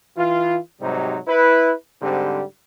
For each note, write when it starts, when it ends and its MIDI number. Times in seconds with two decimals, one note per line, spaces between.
0.18 0.58 52
0.18 0.58 65
0.81 1.18 44
0.81 1.18 48
0.81 1.18 54
0.81 1.18 55
0.81 1.18 63
1.28 1.74 64
1.28 1.74 71
2.02 2.43 44
2.02 2.43 50
2.02 2.43 55
2.02 2.43 60
2.02 2.43 67